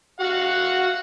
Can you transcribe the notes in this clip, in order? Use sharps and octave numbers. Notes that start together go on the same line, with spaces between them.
F#4 F5 F#5